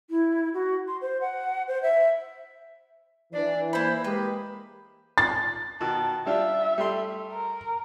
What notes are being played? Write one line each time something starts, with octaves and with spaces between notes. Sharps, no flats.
E4
F#4
C6
C5
F#5
C5
E5
E3 D4 D5
A#3 E4 C5 B5
G#3 G4 A#4 B4
A6
B2 D#3 A5
G3 D4 F4 E5
G3 A3 C6
A#4